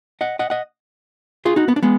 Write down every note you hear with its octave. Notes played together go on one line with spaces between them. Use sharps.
D#5 F#5
D#5 F#5
D#5 F#5
F4 G#4
D#4 F#4
B3
D4
G#3 B3